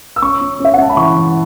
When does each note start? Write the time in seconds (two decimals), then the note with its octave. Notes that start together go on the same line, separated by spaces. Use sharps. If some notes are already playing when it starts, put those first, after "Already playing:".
0.16 E6
0.22 C#4 C#6
0.41 C#4
0.60 C#4 E5
0.74 F#5
0.78 C#4 A5
0.90 B5
0.97 E3 C#6
1.16 E3